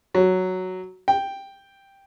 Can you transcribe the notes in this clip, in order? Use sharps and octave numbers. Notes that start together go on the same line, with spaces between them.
F#3
G5